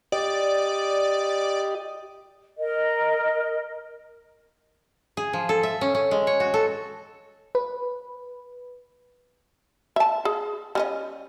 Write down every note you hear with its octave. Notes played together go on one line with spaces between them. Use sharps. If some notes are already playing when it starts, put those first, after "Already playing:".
G4 D5 D#5
A#4 D#5
G#4
F3
A4
E5
C#4
C#4
G#3
C#5
F#4
A4
B4
E5 A5
G#4
G3 C#4 D#5